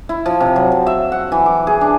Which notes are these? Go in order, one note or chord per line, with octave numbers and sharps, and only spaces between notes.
E4
F3
C3
F#3
A5
E5
F#5
E3
D6
G#4
D4